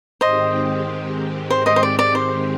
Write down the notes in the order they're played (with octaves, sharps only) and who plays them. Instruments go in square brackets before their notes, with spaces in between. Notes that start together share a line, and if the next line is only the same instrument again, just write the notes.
[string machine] G#2 D#3 G#3 C4 G4 [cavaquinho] C5 D#5
[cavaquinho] C5
C5 D#5
C5
D5
D5
C5